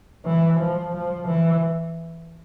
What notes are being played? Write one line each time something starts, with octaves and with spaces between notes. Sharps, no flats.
E3
F3
F3
E3